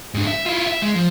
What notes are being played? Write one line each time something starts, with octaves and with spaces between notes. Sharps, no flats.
G#2 D4
E5
E4 F4
E5
G#3
F3